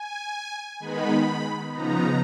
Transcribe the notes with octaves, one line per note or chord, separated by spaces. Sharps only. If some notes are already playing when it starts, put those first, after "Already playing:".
Already playing: G#5
D#3 G#3 B3 D#4 B5
C#3 F3 B3 D#4 A#5